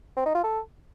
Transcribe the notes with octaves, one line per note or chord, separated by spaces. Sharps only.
C4
D#4
F4
A4